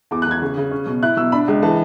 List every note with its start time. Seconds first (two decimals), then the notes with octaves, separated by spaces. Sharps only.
0.11 E2 D6
0.22 F#6
0.27 E2 G#6
0.42 C#3
0.57 C#3
0.71 C#4
0.86 B2
1.03 E4 F#6
1.17 B2 E6
1.32 D4 B5
1.48 C#2
1.63 E3 A5